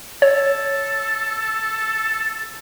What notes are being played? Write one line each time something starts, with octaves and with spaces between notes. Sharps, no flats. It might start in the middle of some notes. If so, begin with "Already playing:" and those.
A4 C#5